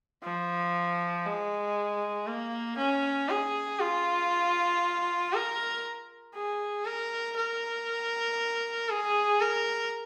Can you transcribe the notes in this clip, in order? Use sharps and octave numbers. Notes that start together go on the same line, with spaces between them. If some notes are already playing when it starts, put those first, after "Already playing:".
F3
G#3
A#3
C#4
G#4
F4
A#4
G#4
A#4
A#4
G#4
A#4